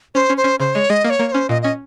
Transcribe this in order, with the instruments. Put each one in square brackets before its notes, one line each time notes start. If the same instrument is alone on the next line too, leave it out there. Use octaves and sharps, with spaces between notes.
[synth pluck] C#4 [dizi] C5
[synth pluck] C#4
[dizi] C5
[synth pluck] C#4
[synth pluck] C#3 [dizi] C5
[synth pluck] G#3 [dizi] C#5
[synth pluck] G#3 [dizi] D#5
[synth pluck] A#3 [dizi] D#5
[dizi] C#5
[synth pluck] A#3
[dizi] C#5
[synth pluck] C#4 [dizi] C5
[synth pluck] A#2 [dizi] D#5
[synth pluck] C#4 [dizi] D#5